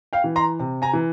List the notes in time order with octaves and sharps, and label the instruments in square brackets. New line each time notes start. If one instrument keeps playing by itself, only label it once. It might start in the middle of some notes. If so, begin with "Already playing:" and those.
[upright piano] F5 G5
E3
A#5 C6
C3
G#5 A#5
E3